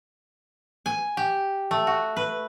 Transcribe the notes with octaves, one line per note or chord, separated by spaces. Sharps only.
G#5
G4
A3
F#4
B4